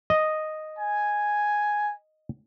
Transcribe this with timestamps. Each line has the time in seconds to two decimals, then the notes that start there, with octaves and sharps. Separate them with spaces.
0.10 D#5
0.79 G#5